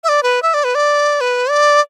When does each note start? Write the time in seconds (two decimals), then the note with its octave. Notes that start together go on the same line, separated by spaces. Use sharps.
0.04 E5
0.09 D5
0.23 B4
0.42 E5
0.54 D5
0.64 B4
0.75 D5
1.21 B4
1.50 D5